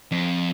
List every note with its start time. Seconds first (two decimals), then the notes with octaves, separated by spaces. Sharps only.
0.12 F2